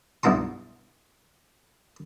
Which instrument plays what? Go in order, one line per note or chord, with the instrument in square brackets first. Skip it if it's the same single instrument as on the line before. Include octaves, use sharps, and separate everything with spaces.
[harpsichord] B1 G2 E4 A#5 C6